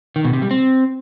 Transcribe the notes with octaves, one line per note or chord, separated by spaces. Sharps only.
D#3
B2
C3
G3
C4